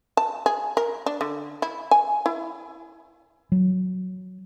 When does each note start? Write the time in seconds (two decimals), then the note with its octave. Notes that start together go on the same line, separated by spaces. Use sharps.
0.17 A5
0.46 G#4
0.77 A#4
1.06 D4
1.21 D3
1.62 E4
1.91 G#5
2.26 E4
3.52 F#3